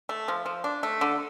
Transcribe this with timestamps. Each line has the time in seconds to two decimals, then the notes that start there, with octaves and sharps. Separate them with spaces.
0.09 A3
0.28 F3
0.46 F3
0.64 D4
0.83 A3
1.01 D3